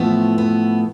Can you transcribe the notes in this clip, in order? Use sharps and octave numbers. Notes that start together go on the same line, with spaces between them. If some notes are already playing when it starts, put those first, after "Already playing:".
Already playing: A2 F3 A3 B3
B3